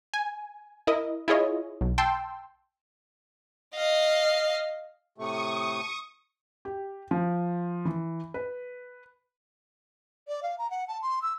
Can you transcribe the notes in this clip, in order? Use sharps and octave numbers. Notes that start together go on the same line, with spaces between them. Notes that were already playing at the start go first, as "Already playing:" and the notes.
G#5
E4 A#4 D#5
E4 F4 G#4 C#5 D#5
B1
G5 A5 C6 E6
D#5 F5
A2 C3 A3 C#6 D#6
G4
F3
E3
B4
D5
F5
A#5
F#5
A5
C6
E6